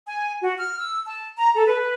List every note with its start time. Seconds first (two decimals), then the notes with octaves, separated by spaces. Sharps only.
0.06 G#5
0.41 F#4
0.57 F6
0.78 E6
1.06 A5
1.37 A#5
1.55 A4
1.66 B4